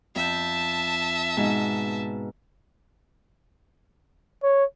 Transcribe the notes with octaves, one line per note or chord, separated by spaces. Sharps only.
F2 E5 A5 G6
G#2 B2
C#5